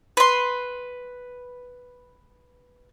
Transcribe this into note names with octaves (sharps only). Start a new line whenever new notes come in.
B4 C6